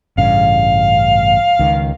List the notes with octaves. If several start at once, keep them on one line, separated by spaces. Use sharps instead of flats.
A1 G2 C#3 F5
C#2 D#3